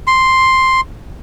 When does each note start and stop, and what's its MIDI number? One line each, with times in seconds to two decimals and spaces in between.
0.07 0.81 84